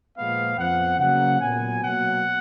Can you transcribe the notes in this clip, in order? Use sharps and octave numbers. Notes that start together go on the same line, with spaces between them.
A#2 F3 G#3 B3 F5
F2 F3 B3 F#5
C#3 F#3 A#3 F#5
A#2 F#3 B3 G#5
B2 F#3 A#3 F#5